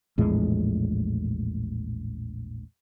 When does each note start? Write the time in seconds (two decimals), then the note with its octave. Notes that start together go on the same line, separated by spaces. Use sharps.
0.18 A#1 E2 A2 G#3